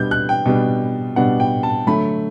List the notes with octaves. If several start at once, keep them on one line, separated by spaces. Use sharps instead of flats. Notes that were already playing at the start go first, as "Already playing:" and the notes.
Already playing: B2 G3 B3 D4 G6
F#6
G5
B2 G3 B3 D4
B2 G3 B3 D4 F#5
G5
A5
D3 F#3 A3 B5